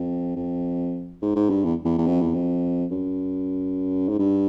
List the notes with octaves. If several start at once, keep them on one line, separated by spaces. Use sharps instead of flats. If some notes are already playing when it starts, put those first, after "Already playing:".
Already playing: F2
F2
G#2
G#2
G2
E2
E2
E2
F2
E2
F2
F#2
G#2
G2